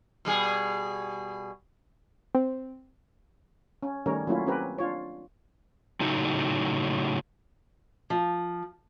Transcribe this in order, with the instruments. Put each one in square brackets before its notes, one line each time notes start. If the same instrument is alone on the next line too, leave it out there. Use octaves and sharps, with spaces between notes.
[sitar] B2 G3 G#4
[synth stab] C4
[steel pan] C#4
D#3 G3 A3 C#4 A#4 C#5
F#3 A3 A#3 C#4 E4 F4
C4 C#4 G4 A#4 B4
D4 F4 C#5
[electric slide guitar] A2 C#3 F#3 A3 D#4
[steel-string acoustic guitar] F3